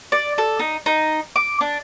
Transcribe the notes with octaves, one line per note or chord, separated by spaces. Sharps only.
D5
A4
D#4
D#4
D6
D4